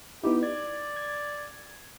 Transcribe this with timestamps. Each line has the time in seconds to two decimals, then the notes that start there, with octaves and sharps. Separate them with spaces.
0.23 B3 D#4 E4 G4
0.43 D5 G#6
0.96 G#6